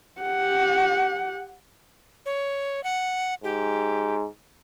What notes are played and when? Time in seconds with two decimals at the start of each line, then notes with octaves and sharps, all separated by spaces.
0.21 G4 F#5
2.26 C#5
2.84 F#5
3.44 G#2 G4